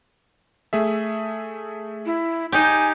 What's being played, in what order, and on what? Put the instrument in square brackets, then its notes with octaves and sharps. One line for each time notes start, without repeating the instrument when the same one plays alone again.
[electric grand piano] A3 G#4 E5
[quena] E4
[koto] D#4 G4 [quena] G#5